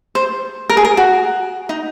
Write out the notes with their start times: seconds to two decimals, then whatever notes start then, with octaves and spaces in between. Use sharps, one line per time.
0.15 C5
0.70 A#4
0.77 G#4
0.85 A#4
0.97 F#4
1.69 D#4